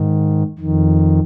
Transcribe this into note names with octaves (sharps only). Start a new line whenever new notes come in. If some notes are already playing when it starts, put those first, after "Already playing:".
Already playing: G#2 D#3
F2 D#3